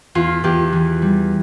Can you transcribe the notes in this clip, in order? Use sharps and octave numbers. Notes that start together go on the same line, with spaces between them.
E2 F4
E2 G4
E3
G3